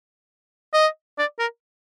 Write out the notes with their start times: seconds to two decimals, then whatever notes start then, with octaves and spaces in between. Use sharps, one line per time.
0.73 D#5
1.18 D5
1.39 A#4